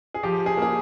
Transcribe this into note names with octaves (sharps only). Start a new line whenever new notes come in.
G#4
F3 G4
G#4
A#3 G#4